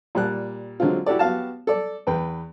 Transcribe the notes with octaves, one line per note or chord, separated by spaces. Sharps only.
A#2 G3 F#6
D3 F#3 G#3 C4 F4
E4 F#4 G4 A4 D5
B3 F#4 G4 F5 A5
A4 D5
E2 B4 G5